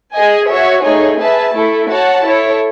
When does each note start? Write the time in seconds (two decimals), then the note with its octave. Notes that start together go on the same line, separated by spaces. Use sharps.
0.13 G#4 D#5 G#5
0.48 F#4 C#5 E5
0.83 A3 D#4 G#4 C#5
1.18 G#4 B4 E5 A5
1.54 A3 E4 A4
1.88 F#4 C#5 F#5 A5
2.24 E4 A4 C#5